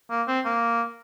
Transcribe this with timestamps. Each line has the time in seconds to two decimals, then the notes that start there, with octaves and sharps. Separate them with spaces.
0.10 A#3
0.27 C4
0.45 A#3